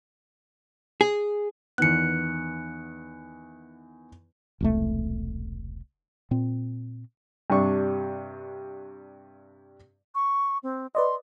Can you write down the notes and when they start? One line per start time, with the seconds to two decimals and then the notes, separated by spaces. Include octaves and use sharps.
1.01 G#4
1.78 E2 D#3 B3 F#6 C#7
4.61 E1 C2 A3
6.31 A#2 C4
7.50 G2 C3 D4 C#6
10.15 C#6
10.63 C4
10.95 B4 D5 D#5 C6